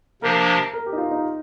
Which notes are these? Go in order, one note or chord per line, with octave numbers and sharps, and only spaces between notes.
C3 F3 A#3 D4 G4 A#4
A#4
G4
D#4
F4
D#4